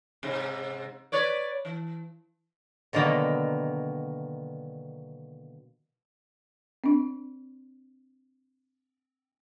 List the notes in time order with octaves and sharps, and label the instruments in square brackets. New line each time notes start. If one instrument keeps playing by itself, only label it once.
[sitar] G#2 C3
B4 C#5 D5
E3
[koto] B2 D3 D#3 F#3 A#3 B3
[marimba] C4 D4